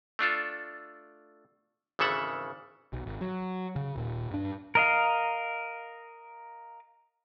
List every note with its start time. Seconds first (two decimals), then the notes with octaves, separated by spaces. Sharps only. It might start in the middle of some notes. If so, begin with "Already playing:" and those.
0.19 A3 D4 F4 A4
1.99 G#1 C#3 E3 A4 E5 F#5
2.93 B1
3.06 G#1
3.21 F#3
3.76 C#3
3.96 D#1 A#2
4.31 G2 D4
4.75 A#4 D#5 F5